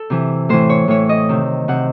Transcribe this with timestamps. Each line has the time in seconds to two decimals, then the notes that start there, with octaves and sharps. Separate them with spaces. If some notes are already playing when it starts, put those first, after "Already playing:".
Already playing: A4
0.10 C3 E3
0.49 A2 E3 C5
0.69 C#5
0.88 A2 E3 C#5
1.09 D#5
1.29 C3 D#3
1.68 C3 D#3 F#5